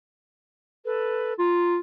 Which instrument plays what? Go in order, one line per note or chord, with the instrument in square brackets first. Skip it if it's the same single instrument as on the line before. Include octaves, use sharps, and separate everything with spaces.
[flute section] A4 B4
[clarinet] F4 [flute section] A#5